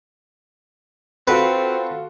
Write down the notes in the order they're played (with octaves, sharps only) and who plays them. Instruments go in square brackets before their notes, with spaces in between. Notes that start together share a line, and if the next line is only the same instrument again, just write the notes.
[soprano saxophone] C4 [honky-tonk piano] F4 F#4 A4 [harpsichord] B4